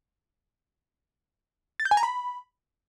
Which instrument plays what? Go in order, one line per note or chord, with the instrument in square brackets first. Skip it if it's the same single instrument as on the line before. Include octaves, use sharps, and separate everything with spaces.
[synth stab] A6
G6
G#5
A#5
B5